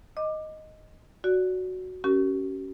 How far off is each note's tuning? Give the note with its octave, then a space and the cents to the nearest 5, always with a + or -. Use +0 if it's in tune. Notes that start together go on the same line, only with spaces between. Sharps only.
D#5 +0 D6 +20
F#4 +0 D5 -15
C#4 +0 G4 -45 A#4 +0